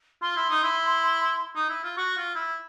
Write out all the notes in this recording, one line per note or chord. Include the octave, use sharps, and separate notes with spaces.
F4 C6
E4
D#4
E4
D#4
E4
F4
F#4 C#6
F4
E4